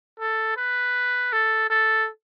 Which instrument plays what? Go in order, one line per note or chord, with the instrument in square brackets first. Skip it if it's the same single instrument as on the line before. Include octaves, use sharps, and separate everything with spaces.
[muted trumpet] A4
B4
A4
A4